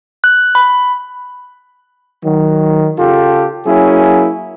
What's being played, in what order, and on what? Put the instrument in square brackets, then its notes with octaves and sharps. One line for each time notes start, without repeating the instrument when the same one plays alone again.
[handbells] F#6
B5
[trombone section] D#3 F#3
C#3 F4 G4 A4
F#3 A#3 C#4 E4 G#4